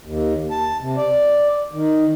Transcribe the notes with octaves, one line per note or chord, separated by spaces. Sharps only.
D#2
A5
C3
D5
D#3